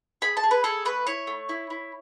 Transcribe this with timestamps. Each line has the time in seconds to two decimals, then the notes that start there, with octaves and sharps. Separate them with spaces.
0.22 G#4 B5
0.37 A5
0.43 G#4
0.51 B4
0.64 G#4 A4
0.85 A3 B4
1.07 E4 C#5
1.27 A3
1.49 E4
1.70 E4